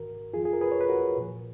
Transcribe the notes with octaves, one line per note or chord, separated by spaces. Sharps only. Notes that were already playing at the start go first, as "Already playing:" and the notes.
Already playing: G#2 D#3 F#4 A#4
F2 F3 F4 G#4
G#4
A#4
G#4 B4
C#5
B4
F#4 A#4
A#2 F3